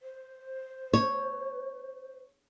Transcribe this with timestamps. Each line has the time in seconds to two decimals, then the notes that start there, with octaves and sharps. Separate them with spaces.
0.03 C5
0.93 C#5